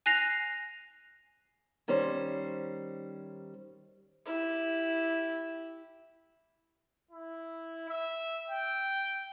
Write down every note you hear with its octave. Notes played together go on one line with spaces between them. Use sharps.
G#5 F#6 A#6 C7 F7
D#3 G3 C#4 C5
E4 G4
E4
E5
G5